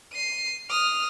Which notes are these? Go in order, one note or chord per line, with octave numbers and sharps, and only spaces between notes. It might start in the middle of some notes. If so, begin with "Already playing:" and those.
C7 D#7
D#6 F6